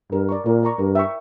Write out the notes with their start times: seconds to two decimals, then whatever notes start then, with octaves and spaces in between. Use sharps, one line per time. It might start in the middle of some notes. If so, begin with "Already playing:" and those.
0.12 G2 A#4
0.29 D5 A#5 C#6
0.46 A#2 A#4
0.63 D5 A#5 C#6
0.79 G2 A#4
0.95 E5 G5 C#6